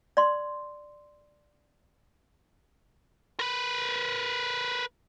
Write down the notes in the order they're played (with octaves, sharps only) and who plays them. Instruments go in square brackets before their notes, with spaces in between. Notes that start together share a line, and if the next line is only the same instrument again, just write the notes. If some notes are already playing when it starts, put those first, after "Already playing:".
[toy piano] D5 C6
[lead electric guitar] A#4 B4